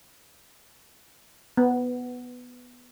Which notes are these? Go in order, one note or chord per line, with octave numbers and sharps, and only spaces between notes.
B3